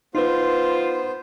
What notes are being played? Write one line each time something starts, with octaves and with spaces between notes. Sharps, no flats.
B3 D#4 F4 B4 C5